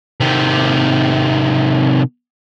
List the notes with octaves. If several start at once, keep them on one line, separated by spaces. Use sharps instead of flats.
C3 D#3